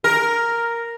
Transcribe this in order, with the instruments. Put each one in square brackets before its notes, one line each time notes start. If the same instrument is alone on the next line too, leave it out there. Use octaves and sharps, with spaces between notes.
[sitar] A#4